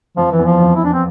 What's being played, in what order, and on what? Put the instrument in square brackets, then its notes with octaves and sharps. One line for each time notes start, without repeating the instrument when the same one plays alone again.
[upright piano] F2 [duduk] F3
[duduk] E3
[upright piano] E2
[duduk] F3
[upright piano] F2
[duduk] E4
D4
C4